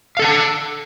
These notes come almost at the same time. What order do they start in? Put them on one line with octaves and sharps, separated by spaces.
F5 A4 F#5 A5